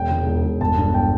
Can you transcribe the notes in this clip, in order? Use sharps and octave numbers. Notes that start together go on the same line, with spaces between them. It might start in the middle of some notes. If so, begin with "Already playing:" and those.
Already playing: E1 G5
E1
E1
E1
G1 A5
G2 A5
G5